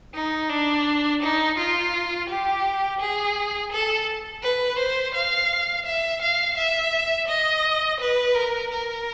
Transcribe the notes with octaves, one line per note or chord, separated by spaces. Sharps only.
D#4
D4
D#4
F4
G4
G#4
A4
B4
C5
F5
E5
F5
E5
D#5
B4
A#4
A#4